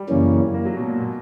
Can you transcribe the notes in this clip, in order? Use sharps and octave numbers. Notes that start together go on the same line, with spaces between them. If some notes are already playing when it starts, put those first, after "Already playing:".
Already playing: G3
F#2 C#3 E3 A#3 C#4
A#3
F#3
B2
A#2
B2